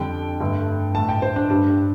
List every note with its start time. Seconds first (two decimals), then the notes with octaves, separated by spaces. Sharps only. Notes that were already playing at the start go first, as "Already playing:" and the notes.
Already playing: F2 D3 G3 G5
0.40 G2 D3 A3
0.95 A2 A3 A5
1.09 G5
1.22 C5
1.36 D4
1.50 G2 G3 D4